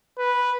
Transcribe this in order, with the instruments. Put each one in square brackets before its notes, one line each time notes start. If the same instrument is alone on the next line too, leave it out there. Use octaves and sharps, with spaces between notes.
[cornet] B4